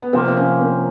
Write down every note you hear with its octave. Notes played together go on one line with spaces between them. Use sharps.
B3
C3 F3 A#3 C4
C4
C#4
C4